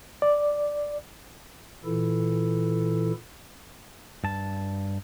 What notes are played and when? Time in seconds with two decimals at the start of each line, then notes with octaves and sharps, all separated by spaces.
0.22 D5
1.85 A#2 E3 E4 A4
4.24 G2 A5